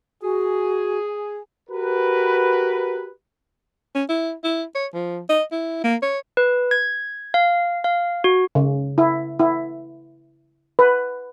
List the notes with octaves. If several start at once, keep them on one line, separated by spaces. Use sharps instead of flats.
F#4 G#4
F#4 G4 A#4 B4
C#4
E4
E4
C#5
F3
D#5
E4
A#3
C#5
B4
G#6
F5
F5
F#4
C#3
E4
E4
B4